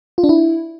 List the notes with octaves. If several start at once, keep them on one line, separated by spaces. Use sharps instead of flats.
F4
D4
E4